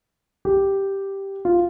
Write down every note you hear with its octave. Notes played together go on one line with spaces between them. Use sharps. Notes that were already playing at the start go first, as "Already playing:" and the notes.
G4
F4